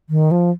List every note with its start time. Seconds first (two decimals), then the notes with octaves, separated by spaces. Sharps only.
0.10 D#3
0.31 F3